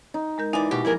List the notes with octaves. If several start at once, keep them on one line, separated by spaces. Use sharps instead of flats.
D#4
G#3 A#4 G6
E3 D#4 D5 G#5
B2 G4
F3 E4 G#4 A#4